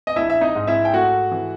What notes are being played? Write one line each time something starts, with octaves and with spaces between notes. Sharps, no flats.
D#5
A#1 E4 E5
E5
D#4 D#5
G#2
E4 E5
G5
A3 F#4 F#5
E3